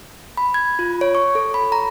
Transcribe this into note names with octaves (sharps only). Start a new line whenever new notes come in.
B5
G#6
F4
C#5
C#6
A4
B5
A#5